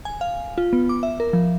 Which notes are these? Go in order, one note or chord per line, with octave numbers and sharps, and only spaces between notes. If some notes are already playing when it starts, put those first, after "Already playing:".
G#5
F5
F4
B3
D6
E5
A#4
F3